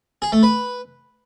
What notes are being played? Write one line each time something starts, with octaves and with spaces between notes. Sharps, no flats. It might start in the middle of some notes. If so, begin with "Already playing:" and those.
G#4
A3
B4